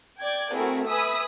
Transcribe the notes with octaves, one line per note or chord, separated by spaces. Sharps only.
D5 G5 G#6
A3 C4 E4 F#4 G#4 A#4
B4 E5 G#5 B5 D#6 E6